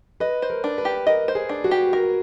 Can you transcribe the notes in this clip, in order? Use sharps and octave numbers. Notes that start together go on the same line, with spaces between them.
B4 D#5
C5
A#4
D4
B4
G4
A#4 D#5
C5
G#4
D4
F#4
G4
A#4